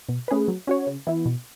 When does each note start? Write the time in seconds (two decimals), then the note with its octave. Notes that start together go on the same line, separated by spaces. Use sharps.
0.09 B2
0.28 A3 C#4 G#4 B4
0.48 F#3
0.67 C#4 F#4 C#5
0.87 C#3
1.07 E3 B3 E4
1.26 B2